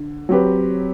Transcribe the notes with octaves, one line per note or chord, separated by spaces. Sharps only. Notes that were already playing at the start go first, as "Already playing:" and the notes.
Already playing: D3
F#3 C4 G4 B4